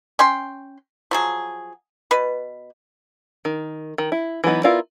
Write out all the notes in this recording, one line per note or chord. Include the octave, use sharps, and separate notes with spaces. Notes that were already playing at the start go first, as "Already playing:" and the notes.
C#4 G5 C6
F3 F#3 G#4
B2 B4
D#3
D#3
E4
E3 F#3 B3 D#4
B3 E4 F4 A#4 D5